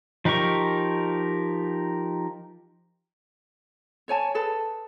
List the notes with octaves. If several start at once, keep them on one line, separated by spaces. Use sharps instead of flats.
F3 D#4 G4 A#4 C#6
C5 C#5 G#5 A5
G#4 A4 B4 A5